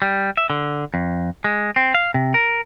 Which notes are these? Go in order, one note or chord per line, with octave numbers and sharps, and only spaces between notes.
G3
E5
D3
F2
G#3
C4
F5
C3
A#4